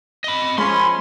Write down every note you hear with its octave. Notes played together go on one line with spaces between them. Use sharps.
D#5 B5
F3 G#3 C#4 B5 C6